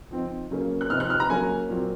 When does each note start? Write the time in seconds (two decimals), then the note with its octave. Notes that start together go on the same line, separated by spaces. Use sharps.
0.11 F3 C4 D#4
0.51 C#3 F#3 A#3 C#4
0.81 F#6
0.90 C3 F3 C4 D#4 F6
1.00 F#6
1.10 F6
1.20 A#5
1.30 C#3 F#3 A#3 C#4 G#5
1.69 A#2 F#3 C4